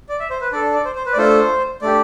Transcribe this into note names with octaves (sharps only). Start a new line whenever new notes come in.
D5
E5
C5
B4
D4 A4 D5
D5
C5
C5
B4
D5
A3 D4 F4 A4 C5
A3 D4 G4 D5